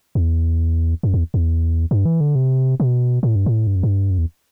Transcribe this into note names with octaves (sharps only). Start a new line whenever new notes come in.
E2
F#2
E2
E2
G2
E3
D3
C3
B2
A2
G2
A2
G2
F#2
G2
F#2
E2